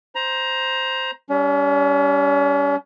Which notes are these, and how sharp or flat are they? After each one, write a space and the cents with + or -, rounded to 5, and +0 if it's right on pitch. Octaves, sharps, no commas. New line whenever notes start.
C5 +0 A#5 +20
G3 +0 C#4 +40